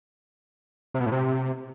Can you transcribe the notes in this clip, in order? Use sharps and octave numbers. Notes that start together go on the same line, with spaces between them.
C3
B2
A2
C3